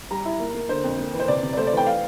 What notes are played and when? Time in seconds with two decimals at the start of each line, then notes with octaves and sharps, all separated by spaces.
0.10 G3 A#5
0.25 E4
0.40 A#3
0.55 A#3
0.69 D3 C5
0.84 F2
0.99 A#3
1.14 E3
1.20 C5
1.28 C3 D5
1.43 C3
1.53 D5
1.57 A3 C5
1.67 D5
1.72 E3 G5
1.87 F5